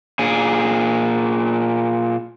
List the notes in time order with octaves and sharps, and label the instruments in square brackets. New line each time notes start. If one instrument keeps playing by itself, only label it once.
[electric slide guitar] A#2 G#4